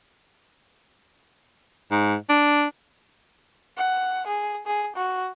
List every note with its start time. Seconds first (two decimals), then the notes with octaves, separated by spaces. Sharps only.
1.91 G#2
2.29 D4
3.77 F#5
4.27 G#4
4.67 G#4
4.96 F#4